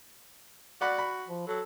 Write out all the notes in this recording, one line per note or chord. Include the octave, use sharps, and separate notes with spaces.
F#4 D5 F#5 B5
B5
F3
F#3 A4